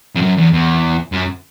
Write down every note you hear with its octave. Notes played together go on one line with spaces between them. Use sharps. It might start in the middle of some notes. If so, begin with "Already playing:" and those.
F2
F#2
E2
E2
F#2